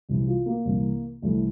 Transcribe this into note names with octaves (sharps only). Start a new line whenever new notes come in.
C2 C3 E3
F4
A#3
C2 C3 E3
C2 C3 E3 A3